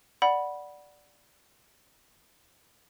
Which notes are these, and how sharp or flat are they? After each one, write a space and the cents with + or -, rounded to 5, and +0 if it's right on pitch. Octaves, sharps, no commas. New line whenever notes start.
D5 +0 F#5 +0 B5 -10